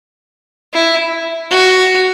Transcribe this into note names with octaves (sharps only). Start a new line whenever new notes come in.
E4
F#4